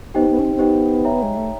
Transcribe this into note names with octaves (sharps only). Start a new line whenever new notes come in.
B3 D#4 G4 C5 D#5 G5
B3
C#4
C4
C4
B3 D#4 G4 C5 D#5 G5
C#5 E5 G5 A#5
G#3
A3